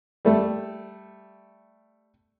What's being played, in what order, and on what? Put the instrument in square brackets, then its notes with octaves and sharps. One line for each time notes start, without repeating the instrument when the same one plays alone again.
[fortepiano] G3 A3 A4